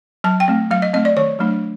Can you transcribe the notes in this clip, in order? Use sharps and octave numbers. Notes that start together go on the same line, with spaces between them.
F#3 A5
G5
A3 C4
F#3 F5
D#5
A3 C4 D#5
D5
D#3 C#5
F#3 A3 D4